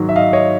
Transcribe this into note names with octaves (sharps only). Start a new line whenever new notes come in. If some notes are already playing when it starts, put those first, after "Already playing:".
Already playing: G#2 D#3 F#3
E5
D#5 F5
C#5 D#5